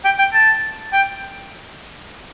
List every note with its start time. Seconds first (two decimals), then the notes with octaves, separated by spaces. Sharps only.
0.04 G5
0.19 G5
0.34 A5
0.93 G5